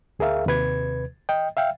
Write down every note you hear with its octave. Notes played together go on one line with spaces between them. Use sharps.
D2 G#4 A#4 E5 F5
D#2 C3 B4 G#6
D#5 G5
E5 F5 G5